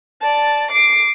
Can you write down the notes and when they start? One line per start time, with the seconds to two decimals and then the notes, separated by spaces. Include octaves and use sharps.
0.21 D5 A5
0.71 D6 C7